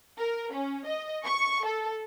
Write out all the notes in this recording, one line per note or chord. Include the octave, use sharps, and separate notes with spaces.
A#4
C#4
D#5
C#6
A4